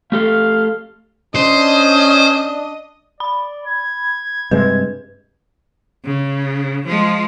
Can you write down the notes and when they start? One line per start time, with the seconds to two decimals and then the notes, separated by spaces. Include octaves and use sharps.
0.12 A3 G4 A4 F5
1.35 C#4 D4 C5 D#5
3.20 D5 B5
3.66 G#6
4.51 G2 C3 G#3 B4
6.06 C#3
6.87 F3 G#3